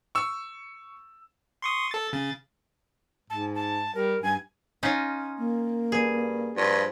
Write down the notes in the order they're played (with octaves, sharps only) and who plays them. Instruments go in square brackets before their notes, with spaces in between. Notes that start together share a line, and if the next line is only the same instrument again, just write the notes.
[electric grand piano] C#6 E6
[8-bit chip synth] C6 C#6 D#6
A4 A6
C#3 A6
[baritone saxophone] G#2 [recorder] A5
[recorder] A5
[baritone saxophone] G3 [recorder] A#4
[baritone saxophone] G2 [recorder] G#5
[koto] C#4 D#4 F4
[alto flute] A#3
[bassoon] G2 [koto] G#4
[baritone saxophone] G2 [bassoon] F3